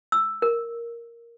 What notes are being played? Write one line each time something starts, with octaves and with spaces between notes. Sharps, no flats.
E6
A#4